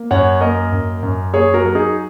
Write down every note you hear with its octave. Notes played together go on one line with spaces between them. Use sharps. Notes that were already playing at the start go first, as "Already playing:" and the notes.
Already playing: A#3
F#2 C#5 F#5
A#3 A#4 D#5
F#2
F#2
A#3 G#4 C#5
F#4 A#4
F#3 A#4
D#4 G#4